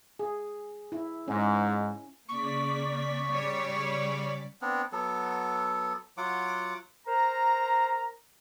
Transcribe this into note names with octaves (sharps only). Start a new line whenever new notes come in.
G#4
E4
G#2 C#4
C#3 A#3 D5 C#6 B6
G3 C#5
B3 C4 D4
F#3 B3 A4
F#3 F4 F#5 D6
A#4 C5 A#5